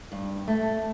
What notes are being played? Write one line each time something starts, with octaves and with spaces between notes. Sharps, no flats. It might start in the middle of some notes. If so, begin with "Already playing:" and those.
G2
A3